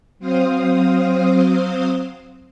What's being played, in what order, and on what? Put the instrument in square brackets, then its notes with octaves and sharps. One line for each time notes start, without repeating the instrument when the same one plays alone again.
[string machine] F#3 C4 C5 F5 D#6